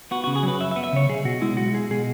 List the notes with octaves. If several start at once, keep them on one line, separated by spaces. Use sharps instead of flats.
B3 F#4
C#3 F#4
G#4
F#3
B4
F#2 E5
E5
B3
E5
C#3 C#5
B1 G#4
B2 F#4
G#3 E4
B1 F#4
B1 G#4
B2 G#4